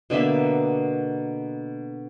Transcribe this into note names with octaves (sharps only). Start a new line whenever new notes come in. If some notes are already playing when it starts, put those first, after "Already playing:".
B2 D3 A#3 E5